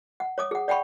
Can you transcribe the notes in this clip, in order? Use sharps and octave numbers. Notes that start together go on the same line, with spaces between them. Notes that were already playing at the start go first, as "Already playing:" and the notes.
F#5
C#5 D6 D#6
G#4 F#5
D5 F#5 G5 B5 C#6